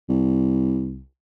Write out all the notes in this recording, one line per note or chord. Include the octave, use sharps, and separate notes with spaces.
C2